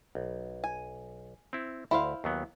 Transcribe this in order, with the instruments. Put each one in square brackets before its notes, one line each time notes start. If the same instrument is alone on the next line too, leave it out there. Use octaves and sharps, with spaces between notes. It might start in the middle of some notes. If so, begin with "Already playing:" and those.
[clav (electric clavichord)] B1
[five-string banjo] G#5
[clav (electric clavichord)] C4 E4
[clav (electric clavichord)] D2 [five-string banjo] E4 C5 F5
[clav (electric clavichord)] D#2 F#3 B3